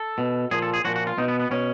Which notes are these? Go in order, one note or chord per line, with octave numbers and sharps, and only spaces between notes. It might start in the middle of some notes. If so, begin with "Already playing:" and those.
Already playing: A4
B2
A#2 F3 G#4
A4
G#4
A#2 F3 F#4
F#4
F4
B2 D#4
B3
B3
B2 C#4